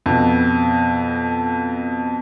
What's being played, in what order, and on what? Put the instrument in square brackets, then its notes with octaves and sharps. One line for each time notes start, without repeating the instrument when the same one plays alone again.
[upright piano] F2 B2